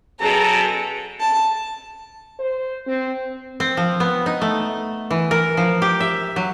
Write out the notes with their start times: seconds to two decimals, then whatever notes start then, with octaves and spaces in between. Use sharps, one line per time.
0.20 B2 F#3 C#4 F#4 G#4 A4 A5 A#5
1.21 A5
2.39 C5
2.87 C4
3.60 C4
3.77 F3
4.00 B3
4.26 D#4
4.41 A3
5.11 E3
5.31 A#4
5.57 F3
5.82 G4
6.00 E5
6.36 F#3